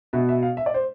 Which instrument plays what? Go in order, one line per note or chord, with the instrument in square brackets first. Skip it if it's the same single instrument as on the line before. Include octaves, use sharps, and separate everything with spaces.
[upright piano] B2 B3 E5
E5
F5
E5
D5
C5